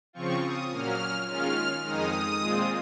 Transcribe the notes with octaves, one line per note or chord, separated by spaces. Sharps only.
C#3 F3 C4 F4 C#6
D#6
A#2 F#3 A#3 C#4 F6
D#3 G#3 C#4 F4 F6
F2 D#3 G#3 D#4 D#6
A#2 G#3 C4 F4